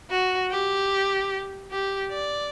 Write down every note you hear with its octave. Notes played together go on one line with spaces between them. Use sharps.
F#4
G4
G4
D5